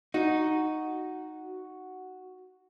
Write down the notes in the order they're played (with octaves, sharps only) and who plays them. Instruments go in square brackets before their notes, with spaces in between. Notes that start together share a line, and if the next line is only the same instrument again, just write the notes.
[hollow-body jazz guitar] D#4 [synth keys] F#4